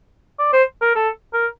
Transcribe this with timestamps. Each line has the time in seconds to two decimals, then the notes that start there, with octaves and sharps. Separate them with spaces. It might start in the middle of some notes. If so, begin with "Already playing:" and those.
0.39 D5
0.53 C5
0.81 A#4
0.96 A4
1.33 A#4